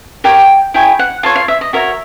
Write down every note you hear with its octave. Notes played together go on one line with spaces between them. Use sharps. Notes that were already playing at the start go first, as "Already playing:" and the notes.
G4 A#4 C#5 G5
E4 G#4 C#5 G5
F#5
F4 A4 C#5 F5
F5
E5
D#5
F#4 A#4 C#5 E5